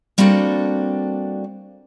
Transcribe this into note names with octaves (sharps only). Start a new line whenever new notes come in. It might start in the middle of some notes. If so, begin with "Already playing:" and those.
G3 A#3 C4 D4 F#4 A4